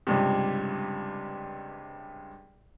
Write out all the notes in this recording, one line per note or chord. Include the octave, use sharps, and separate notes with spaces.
C#2 G2 C3